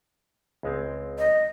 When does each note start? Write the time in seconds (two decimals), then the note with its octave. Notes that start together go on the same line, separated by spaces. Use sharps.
0.63 C#2 G#3 C4
1.18 D#5